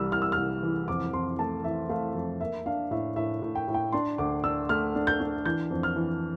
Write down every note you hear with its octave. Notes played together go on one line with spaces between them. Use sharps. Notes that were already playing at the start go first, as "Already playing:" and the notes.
Already playing: C2 E3 G3 E6 F6
C2 F6
E6
F6
C2
E3
F2 D6
F2 C6
A3 A5
E3 E5
A3 F5
F2
A#3 E5
D4 F5
A2 E5
A2 E5
A2
G5
A2
G5
D4 C6
D2 D6
D4 E6
A3 F6
D4
G6
D4
E3 G6
F2
F6
E3